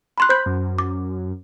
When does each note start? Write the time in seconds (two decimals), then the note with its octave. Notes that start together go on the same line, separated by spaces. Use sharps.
0.18 B5 C6 F#6
0.29 C5 B5 G6
0.46 F#2
0.78 D6